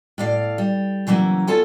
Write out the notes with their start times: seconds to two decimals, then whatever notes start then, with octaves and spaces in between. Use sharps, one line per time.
0.18 A2 D5 F5
0.58 G3
1.07 C#3 E3 F#3 A#3 C#4
1.47 B3 F4 A4 C#5 G#5 A5